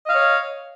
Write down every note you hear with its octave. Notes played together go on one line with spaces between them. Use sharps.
C#5 D#5 F5